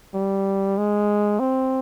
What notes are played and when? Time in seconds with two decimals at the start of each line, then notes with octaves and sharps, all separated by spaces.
0.14 G3
0.77 G#3
1.40 C4